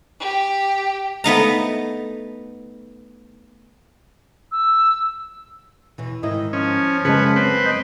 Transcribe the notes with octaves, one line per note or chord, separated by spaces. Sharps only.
G4
A3 B3 D#4 A#5
E6
E2 B2 E3
G#2 D#3 E4 D#5
F3 C#4
F#2 C#3 G#3 B4 C#5 A5
C4 B4
D#5 G6